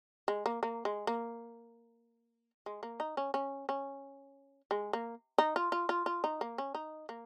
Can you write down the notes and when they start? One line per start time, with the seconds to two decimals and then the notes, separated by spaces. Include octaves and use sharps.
0.28 G#3
0.46 A#3
0.63 A#3
0.85 G#3
1.07 A#3
2.66 G#3
2.83 A#3
3.00 D#4
3.17 C#4
3.34 C#4
3.69 C#4
4.71 G#3
4.93 A#3
5.38 D#4
5.56 F4
5.72 F4
5.89 F4
6.06 F4
6.24 D#4
6.41 A#3
6.58 C#4
6.75 D#4
7.09 A#3